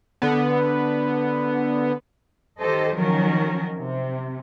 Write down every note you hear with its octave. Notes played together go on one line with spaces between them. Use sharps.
D3 B3
D#3 G4 A4 C5 D#5
D#3 F3 F#3 C#4 A#4
C3